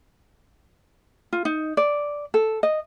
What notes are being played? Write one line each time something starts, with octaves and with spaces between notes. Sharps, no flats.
F4
D#4
D5
A4
D#5